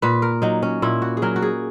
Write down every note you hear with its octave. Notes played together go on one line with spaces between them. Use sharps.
A#2 B4
A#4
F#3 D#4
C#4
A#2 E4
F#4
G#4
F#3 A#4
F#4
G#4